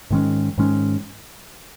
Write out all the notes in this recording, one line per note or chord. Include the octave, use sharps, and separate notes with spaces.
G#2 D#3 G#3 C#4
G#2 D#3 G#3 C#4